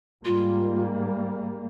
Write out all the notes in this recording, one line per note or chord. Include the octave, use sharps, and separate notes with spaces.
G#2 G3 A#3 F4